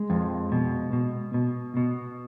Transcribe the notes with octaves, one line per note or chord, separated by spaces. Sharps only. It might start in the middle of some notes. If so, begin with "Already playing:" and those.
Already playing: G#3
F2
B2
B2
B2
B2